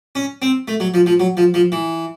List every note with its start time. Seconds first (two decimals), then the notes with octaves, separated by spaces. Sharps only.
0.15 C#4
0.42 C4
0.68 A3
0.80 F#3
0.94 F3
1.06 F3
1.20 F#3
1.37 F3
1.54 F3
1.72 E3